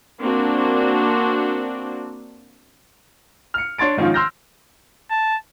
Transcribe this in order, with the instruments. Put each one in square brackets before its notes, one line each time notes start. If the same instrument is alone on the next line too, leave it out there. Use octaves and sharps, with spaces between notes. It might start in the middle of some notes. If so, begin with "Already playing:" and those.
[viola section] A#3 C4 D4 F#4
[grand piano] F6 C#7
D4 C#5 C6 A6 D7
G#2 D#3 F3 C#4 F4
C6 E6 F6 G6 A#6
[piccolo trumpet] A5